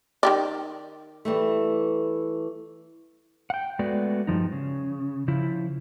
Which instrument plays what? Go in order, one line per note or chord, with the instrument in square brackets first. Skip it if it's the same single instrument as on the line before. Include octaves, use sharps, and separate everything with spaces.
[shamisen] D#3 G4 D5
[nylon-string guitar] E3 G3 A3
[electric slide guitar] F#5 G5
G#3 A3 B3 F#4 D5
G2 C3 F3 D#4
C#3
C#3 F3 E4